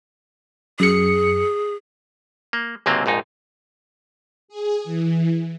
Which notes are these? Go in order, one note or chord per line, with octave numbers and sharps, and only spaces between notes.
F#2 G#4 C#7
A#3
C#2 G#2 C3 F#3 A#3 C4
A#1 F2 G#2 D#4
G#4
E3